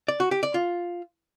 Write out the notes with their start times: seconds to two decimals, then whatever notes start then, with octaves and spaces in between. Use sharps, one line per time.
0.08 D5
0.20 F#4
0.31 G4
0.43 D5
0.54 F4